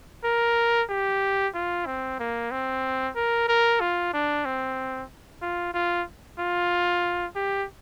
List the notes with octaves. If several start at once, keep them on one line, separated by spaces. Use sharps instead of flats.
A#4
G4
F4
C4
A#3
C4
A#4
A#4
F4
D4
C4
F4
F4
F4
G4